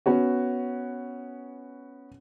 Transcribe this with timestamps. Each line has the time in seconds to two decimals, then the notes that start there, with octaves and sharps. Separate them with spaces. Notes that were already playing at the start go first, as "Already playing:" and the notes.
0.06 B3 C#4 F#4